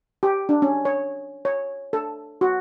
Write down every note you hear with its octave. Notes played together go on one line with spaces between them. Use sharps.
G4
D4
C#4
C#5
C#5
A4
F#4